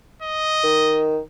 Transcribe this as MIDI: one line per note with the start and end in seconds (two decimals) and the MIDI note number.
0.22 1.03 75
0.64 1.19 51